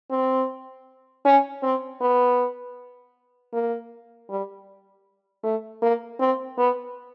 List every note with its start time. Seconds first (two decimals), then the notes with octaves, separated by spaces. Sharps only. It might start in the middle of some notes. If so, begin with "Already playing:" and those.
0.11 C4
1.25 C#4
1.63 C4
2.01 B3
3.53 A#3
4.30 G3
5.43 A3
5.82 A#3
6.20 C4
6.58 B3